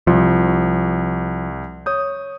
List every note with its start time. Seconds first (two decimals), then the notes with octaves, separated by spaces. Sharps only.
0.07 C2 F3
1.86 C#5 D#6 G6